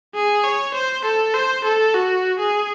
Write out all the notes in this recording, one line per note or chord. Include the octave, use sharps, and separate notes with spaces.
G#4
C#5
C5
A4
C5
A4
F#4
G#4